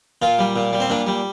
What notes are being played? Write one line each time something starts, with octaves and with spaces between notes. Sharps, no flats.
A#2 F4
G3
A#2
G3
C4
A#2 D4
G3